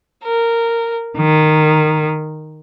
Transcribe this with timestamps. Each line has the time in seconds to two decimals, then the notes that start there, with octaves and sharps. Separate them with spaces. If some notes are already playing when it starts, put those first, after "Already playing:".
0.23 A#4
1.17 D#3